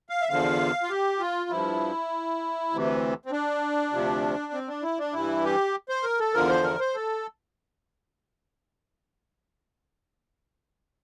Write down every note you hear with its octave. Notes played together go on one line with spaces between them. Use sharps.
F5
E5
E2 D3 F3 F5
F4
G4
F4
G2 F3 E4
D2 C3 E3
C4
D4
D2 C3 F3
C4
D4
E4
D4
G2 E3 E4
G4
C5
A#4
A4
E2 D3 F3 A#4
C5
A#4
C5
A4